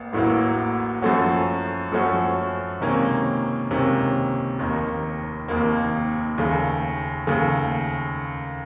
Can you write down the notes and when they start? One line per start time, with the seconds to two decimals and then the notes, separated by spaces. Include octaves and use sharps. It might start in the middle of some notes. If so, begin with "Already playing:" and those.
Already playing: A1 A#3
0.13 A1 A2 F#3 A#3
1.01 F#2 F3 A3 C#4 F#4
1.92 F#2 F3 A3 C#4 F#4
2.80 C#2 C3 D#3 A#3 C#4
3.70 C#2 C3 D#3 A#3 C#4
4.59 F1 D#2 D#3 A#3
5.48 F1 D#2 D#3 A#3
6.38 D#2 C#3 A3
7.27 D#2 C#3 A3